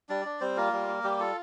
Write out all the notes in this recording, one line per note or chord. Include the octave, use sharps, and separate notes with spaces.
G3 D4 D5
D4
G3 C4 C5
A#3 F4 A#4
G3
A#3
G3 G4
F4 A4